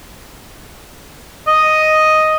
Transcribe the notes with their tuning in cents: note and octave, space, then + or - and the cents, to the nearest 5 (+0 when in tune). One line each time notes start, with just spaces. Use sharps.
D#5 +0